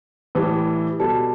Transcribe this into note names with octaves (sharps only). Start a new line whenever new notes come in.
A2 E3 G3
B2 G3 A4